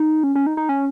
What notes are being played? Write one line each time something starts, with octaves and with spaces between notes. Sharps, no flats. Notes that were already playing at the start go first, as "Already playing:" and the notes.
Already playing: D#4
C#4
C#4
D#4
D#4
C#4